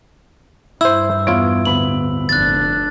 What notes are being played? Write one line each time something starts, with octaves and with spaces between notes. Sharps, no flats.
G2 E4 C5 E6
E2 B3 E4 F4 C#5 D7
D1 B3 B5 F#7
F1 D4 F#6 A6